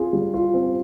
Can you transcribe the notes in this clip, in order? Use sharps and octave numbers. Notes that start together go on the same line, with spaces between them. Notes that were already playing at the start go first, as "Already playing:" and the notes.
Already playing: C4 F4 G#4
G3
F4
C4